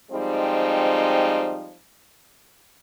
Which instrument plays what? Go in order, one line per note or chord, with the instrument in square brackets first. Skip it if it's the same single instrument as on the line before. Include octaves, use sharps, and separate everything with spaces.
[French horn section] F3 G3 G#3 C4 D#4